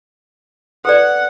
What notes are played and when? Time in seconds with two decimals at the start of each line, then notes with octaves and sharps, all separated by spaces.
0.85 A4 B4 D5 F#5